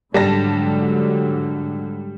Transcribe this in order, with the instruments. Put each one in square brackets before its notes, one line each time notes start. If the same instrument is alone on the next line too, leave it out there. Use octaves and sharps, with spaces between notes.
[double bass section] G#2 D3 F#3 [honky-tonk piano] G3 A5 A#6